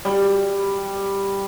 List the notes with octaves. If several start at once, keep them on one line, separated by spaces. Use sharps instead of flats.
G3